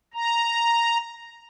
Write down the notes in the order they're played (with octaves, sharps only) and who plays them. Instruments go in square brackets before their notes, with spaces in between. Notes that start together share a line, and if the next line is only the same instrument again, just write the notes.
[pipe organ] A#5